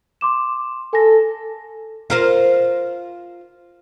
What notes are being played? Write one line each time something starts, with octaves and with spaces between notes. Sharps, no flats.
C6 D6 E7
A4 G#5 A#6
F4 A#4 C5